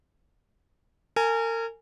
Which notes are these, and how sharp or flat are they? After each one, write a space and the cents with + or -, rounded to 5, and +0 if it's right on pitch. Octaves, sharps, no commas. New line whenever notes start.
A#4 -35 G#5 +0